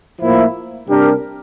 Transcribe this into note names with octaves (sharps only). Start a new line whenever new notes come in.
A2 F3 A#3 E4
C3 G3 D4 G4 A#4